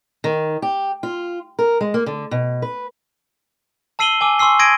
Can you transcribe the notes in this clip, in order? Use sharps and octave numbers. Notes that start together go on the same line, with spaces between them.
D#3
G4
F4
A#4
G#3
A#3
D3
B2
B4
A5 E6 C7 D#7 F#7 G7
G#5 D6 E6
G#5 C6 C#6 E6 C7
C6 D#6 G#6 A#6 D7 D#7